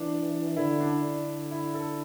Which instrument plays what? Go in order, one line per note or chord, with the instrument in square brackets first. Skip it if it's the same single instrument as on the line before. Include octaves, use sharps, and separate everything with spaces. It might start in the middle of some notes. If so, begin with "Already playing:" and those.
Already playing: [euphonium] E3 [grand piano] D4
[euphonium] D3 [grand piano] E4
[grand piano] D4
[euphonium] D3
[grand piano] E4
A4